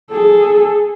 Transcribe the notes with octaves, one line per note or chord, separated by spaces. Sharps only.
G#4 A4